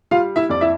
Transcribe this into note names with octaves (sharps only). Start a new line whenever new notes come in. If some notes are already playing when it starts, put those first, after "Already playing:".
G3 F4 F5
E4 E5
F2 D5
E4 E5